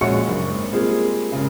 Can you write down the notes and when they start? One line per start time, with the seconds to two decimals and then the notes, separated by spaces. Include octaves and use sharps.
0.01 A#1 G#3 C#4 F#4 C#6 C#7
0.27 F#1 D4
0.48 G#1
0.73 G3 G#3 A#3 C4 F4 G#4
1.32 G#1 C#3